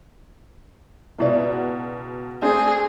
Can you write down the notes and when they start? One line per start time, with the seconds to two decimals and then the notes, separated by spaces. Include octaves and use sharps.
1.18 C#2 B2 D#4 E4 D5
1.52 F#4
2.42 A3 C4 D4 G#4